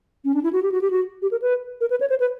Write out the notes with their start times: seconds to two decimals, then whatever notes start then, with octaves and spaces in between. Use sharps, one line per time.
0.25 C#4
0.34 D4
0.43 E4
0.53 F#4
0.63 G4
0.72 F#4
0.81 G4
0.90 F#4
1.22 G4
1.31 A#4
1.42 B4
1.81 A#4
1.90 B4
2.01 C#5
2.10 C5
2.20 B4